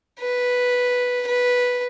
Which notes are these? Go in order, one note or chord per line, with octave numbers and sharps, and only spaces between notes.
B4
B4